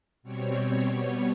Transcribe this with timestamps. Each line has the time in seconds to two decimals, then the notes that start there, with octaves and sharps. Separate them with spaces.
0.23 B2 G3 C4 C#5
0.87 B2 G3 B3 C#5